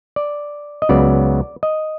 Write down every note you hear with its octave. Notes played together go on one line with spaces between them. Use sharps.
D5
D#5
C#2 C#3 F#3 B3 D5
D#5